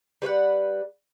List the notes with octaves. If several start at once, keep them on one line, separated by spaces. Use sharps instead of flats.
G3 B4 C#5 F#5